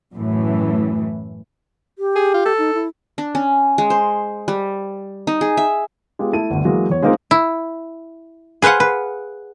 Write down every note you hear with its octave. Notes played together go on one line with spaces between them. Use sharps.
F#2 A2 E3
G4
G#4
F4
A4
D#4
E4
D4
C#4
G#3
C5
G3
D#4
G#4
E5
G#3 B3 F4 G4
A3 E4 A5 D#7
G1 D2
E3 F#3 G#3 A#3
E2 C#5
G#3 A#3 C4 D#4 F4 A#4
E4
G#4 B4 C5 F5 F#5
B4